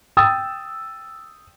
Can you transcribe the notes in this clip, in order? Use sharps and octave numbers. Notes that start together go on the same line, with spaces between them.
G5 D#6 E6 A6